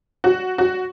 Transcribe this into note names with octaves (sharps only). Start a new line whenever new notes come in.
F#4
F#4